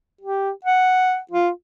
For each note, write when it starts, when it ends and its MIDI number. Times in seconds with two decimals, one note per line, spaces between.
0.21 0.50 67
0.64 1.18 78
1.31 1.49 65